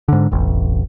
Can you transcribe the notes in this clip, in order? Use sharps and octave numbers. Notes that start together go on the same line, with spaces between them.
G#2 D3
E1 A1